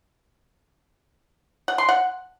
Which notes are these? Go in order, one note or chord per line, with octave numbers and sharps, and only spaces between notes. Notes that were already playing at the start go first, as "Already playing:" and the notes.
F#5
C6
F#5